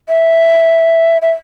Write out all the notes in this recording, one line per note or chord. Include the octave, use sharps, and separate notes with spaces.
E5
E5